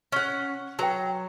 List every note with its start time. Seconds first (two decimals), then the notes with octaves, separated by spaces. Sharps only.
0.12 C#4 F#5
0.79 F#3 F#4 B4 G5